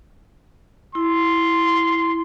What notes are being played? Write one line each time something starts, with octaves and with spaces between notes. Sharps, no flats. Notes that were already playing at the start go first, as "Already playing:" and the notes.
E4 C6